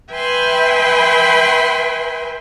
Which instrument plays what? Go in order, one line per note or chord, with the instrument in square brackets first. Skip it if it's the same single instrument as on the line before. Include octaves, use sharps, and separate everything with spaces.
[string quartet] B4 E5 G5 G#5 B5 C6